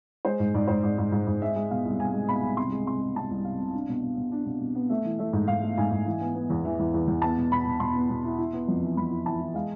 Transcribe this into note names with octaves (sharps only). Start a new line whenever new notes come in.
G#3 C5
G#2
G#2 D5
G#2 C5
G#2 D5
G#2
G#2
G#2
G#3 E5
G#3
B2 F5
C2
C2 G#5
G#3
B2 B5
C2
C3 C6
G#3
C3 C6
G#3
C3 A5
C2
C3 F5
C3
D4
B2
B2
B2
D4
B2
B2
B3
A3 E5
E3
A3 E5
G#2
G#2 F5
A3
G#2 G#5
G#2
E3
B3
B3
E2
E3
E2
E2
E2
B3 A5
B2
B2 B5
B2
B2 C6
B3
B2
E4
E4
B3
F2
E3
F2 B5
E4
E3 A5
E3
G#3 F5